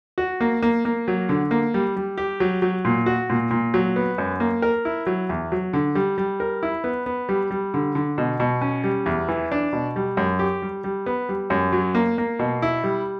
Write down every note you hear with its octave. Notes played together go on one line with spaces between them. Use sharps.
F#4
A#3
A#3
A#3
F#3
D3
A#3
G3
G3
G4
F#3
F#3
A#2
F#4
A#2
A#2
F#3
B3
F#2
A#3
A#4
E4
F#3
E2
F#3
D3
G3
G3
A#4
E4
B3
B3
G3
G3
D3
D3
B2
B2
C#4
G3
E2
E3
D4
B2
G3
F#2
G4
G3
G3
B3
G3
F#2
F#3
A#3
A#3
B2
E4
G3